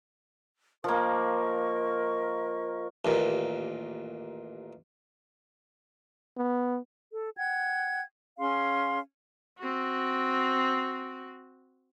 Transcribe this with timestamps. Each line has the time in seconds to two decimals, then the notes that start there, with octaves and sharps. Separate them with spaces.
0.84 F3 A#3 A#4 D#5 C#6
3.05 A1 D#2 A#2
6.37 B3
7.12 A4
7.38 F#5 G5 G#6
8.39 C#4 G#4 F5 C6
9.59 C4 F#4